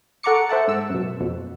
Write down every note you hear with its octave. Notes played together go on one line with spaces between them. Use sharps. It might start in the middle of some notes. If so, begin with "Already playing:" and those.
A4 F#5 A#5 C#6 D6 C#7
C5 E5 F#5 A5
G#2 E6
F#2 B2
F2 B2